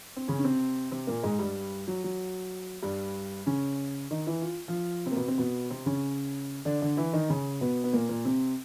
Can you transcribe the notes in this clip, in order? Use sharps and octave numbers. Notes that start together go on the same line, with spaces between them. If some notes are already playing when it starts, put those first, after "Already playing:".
C4
C#3 C#4
C#4
C3 C4
C3 C4
A#2 A#3
G#2 G#3
G2 G3
F#3
F#3
G2 G3
C#3 C#4
D#3 D#4
E3 E4
F4
F3 F4
C3 C4
A#3
B2 B3
C3 C4
B2 B3
C3 C4
C#3 C#4
D3 D4
D3 D4
E3 E4
D#3 D#4
C#3 C#4
B2 B3
B3
A#2 A#3
A#2 A#3
C3 C4